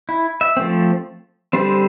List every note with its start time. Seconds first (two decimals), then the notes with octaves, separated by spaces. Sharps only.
0.09 E4
0.41 E5
0.57 F3 A3 C4
1.53 D3 G3 C4 C5